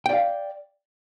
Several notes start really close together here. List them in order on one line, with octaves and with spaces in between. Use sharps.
G5 D5 F5